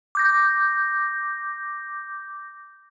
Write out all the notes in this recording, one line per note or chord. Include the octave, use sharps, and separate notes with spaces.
D6 G6 A#6